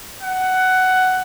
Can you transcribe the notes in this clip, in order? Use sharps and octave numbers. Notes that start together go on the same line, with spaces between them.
F#5